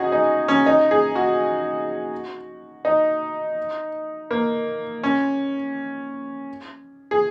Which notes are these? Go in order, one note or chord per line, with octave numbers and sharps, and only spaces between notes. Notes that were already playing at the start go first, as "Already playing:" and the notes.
Already playing: C#4 D#4 F#4 G#4
D#4
C#4
D#4
G#4
F#4
D#4
A#3
C#4
G#4